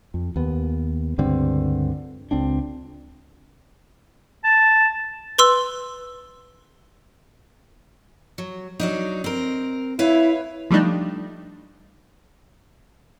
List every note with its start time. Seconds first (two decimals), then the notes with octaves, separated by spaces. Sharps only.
0.14 F2
0.36 D#2 B3
1.18 C#2 G2 D3 C4
2.31 C#2 C4 D4
4.44 A5
5.38 B4 C6 E6
8.38 F#3
8.80 F#3 D4 D#4
9.24 C4 A#4
9.99 E4 B4 C#5 F5
10.71 F3 G3 A3 D4 D#4